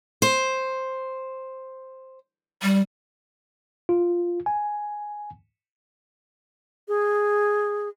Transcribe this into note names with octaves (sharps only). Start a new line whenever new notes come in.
C5
G3
F4
G#5
G#4